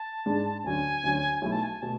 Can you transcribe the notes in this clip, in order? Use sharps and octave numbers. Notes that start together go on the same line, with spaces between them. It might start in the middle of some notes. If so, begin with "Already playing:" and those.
Already playing: A5
G#2 G#3 D4
D2 D3 F#3 C#4 G#5
D2 D3 F#3 C#4
B1 B2 A3 E4 G#5
A5
G#5
B2 A3 A5